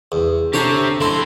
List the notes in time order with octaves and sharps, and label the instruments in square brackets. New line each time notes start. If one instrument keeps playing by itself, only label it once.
[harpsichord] E2
[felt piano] D3 [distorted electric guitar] G4 C5 [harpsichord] A4 C#5 A#5
[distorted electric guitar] F2 C6 [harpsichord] A3 E4